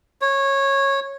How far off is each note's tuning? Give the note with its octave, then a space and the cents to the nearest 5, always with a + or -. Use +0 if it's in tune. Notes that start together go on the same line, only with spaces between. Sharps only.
C#5 -15